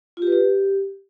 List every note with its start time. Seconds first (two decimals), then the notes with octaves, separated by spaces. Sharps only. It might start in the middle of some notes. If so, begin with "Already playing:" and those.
0.17 F4
0.22 G4
0.27 B4
0.32 G4